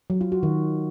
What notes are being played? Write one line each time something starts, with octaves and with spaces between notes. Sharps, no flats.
F#3
F4
F#4
D#3